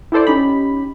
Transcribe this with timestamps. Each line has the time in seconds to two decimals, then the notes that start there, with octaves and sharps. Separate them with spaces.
0.12 E4 G4 A4 C5 D5
0.27 C#4 D#4 G4 B5